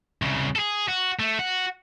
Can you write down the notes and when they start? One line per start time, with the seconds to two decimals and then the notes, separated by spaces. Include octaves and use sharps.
0.22 C2 C#3
0.56 G#4 A4
0.88 F#4
1.19 A3
1.39 F#4